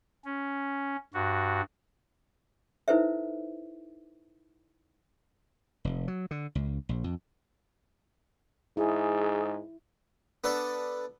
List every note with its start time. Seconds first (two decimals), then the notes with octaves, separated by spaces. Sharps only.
0.25 C#4
1.14 G2 F#4
2.88 D#4 E4 A4 B4 C5 E5
5.85 F1
6.08 F#3
6.31 D3
6.55 C#2
6.89 A#1
7.04 F2
8.77 G#2 E4 G#4
10.44 B3 D4 A4 B4